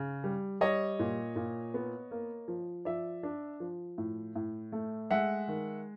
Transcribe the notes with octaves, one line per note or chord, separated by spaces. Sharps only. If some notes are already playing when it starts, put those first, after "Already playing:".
Already playing: C#3
G3
G3 C#5 D#5
A#2
A#2
B3
A#3
F3
F3 D5 E5
D4
F3
A2
A2
A3
G#3 E5 F#5
D#3